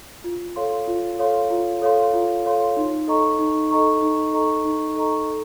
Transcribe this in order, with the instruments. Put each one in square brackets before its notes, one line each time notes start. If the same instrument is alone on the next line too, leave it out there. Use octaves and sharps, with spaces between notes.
[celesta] F4
A4 C#5 F5 C6
F4
A4 C#5 F5 C6
F4
A4 C#5 F5 C6
F4
A4 C#5 F5 C6
D#4
A4 D#5 A#5 C#6
D#4
A4 D#5 A#5 C#6
D#4
A4 D#5 A#5 C#6
D#4
A4 D#5 A#5 C#6
A4